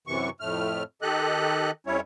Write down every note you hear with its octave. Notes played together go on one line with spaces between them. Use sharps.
F#2 C3 E3 C#6
F2 A2 A3 F6
D#3 G4 A4 D#5 F#6
F2 G3 C#4 E4 C#5